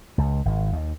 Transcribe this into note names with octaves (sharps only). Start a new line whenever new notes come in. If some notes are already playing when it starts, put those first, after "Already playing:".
C#2
G#1
D#2